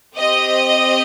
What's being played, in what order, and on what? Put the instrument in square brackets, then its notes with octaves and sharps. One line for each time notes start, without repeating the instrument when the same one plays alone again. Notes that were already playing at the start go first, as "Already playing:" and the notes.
[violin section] C4 G4 D#5